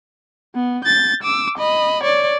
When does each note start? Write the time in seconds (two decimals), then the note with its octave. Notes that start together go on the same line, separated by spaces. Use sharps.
0.55 B3
0.85 G6 A6
1.23 D6 E6
1.58 D#5 B5
2.04 C#5 D5